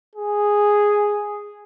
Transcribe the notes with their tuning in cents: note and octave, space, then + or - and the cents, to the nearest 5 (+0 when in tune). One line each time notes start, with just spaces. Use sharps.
G#4 -5